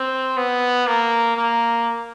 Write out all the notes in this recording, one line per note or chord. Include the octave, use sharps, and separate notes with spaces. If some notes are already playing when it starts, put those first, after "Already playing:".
Already playing: C4
B3
A#3
A#3